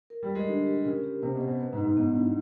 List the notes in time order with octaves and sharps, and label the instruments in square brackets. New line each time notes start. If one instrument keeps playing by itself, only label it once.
[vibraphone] A#4
[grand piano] G3
[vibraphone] A#4
[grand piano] G#3
[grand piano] D3 [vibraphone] G4
[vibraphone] G4
[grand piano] C#3 [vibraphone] A#4
[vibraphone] G4
[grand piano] C3 [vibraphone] C5
[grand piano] B2
[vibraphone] C5
[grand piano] B2
[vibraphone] B4
[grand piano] G#2
[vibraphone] D#4
[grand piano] G#2
[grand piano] G#2 [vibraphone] B3
[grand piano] G2
[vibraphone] E4